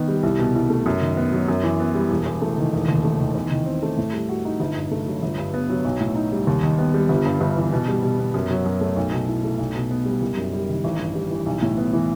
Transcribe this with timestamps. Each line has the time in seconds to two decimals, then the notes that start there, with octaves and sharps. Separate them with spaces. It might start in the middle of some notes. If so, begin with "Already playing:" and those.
Already playing: D#3 B3
0.08 G3
0.23 C2
0.39 B2
0.55 C2
0.70 A3
0.86 F#2
1.02 D#3
1.17 B3
1.32 F#3
1.48 F#2
1.63 E3
1.80 B3
1.95 G3
2.10 E1
2.26 E2
2.42 A3
2.58 D#3
2.73 E1
2.88 D#2
3.04 A3
3.19 D#3
3.35 E2
3.51 D#3
3.66 C4
3.83 A3
3.97 A2
4.13 G3
4.29 F#4
4.45 D#4
4.60 G1
4.75 G2
4.91 A3
5.06 F#3
5.22 G1
5.38 G2
5.54 B3
5.70 F#3
5.85 B1
6.00 A2
6.15 D#4
6.32 G3
6.47 D#2
6.63 D#3
6.79 B3
6.94 G3
7.09 G1
7.26 G2
7.41 G1
7.57 E3
7.73 B2
7.88 G3
8.03 B2
8.19 B3
8.34 F#2
8.51 F#3
8.66 F#2
8.81 A3
8.97 B1
9.12 B2
9.28 E4
9.44 A3
9.59 B1
9.75 B2
9.91 B3
10.05 G3
10.21 F#1
10.37 F#2
10.53 G3
10.69 D#3
10.84 A1
10.99 G2
11.15 G3
11.31 E3
11.46 B1
11.62 A2
11.78 B3
11.93 E3